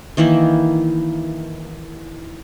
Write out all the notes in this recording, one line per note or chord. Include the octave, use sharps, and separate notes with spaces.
D#3 E3 A#3 E4